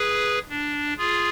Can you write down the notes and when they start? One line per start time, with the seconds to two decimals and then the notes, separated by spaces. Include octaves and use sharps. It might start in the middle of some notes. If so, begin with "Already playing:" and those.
Already playing: G#4 B4
0.49 D4
0.98 F4 G#4